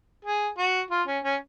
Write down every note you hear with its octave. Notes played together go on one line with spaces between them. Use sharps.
G#4
F#4
F4
C#4
C#4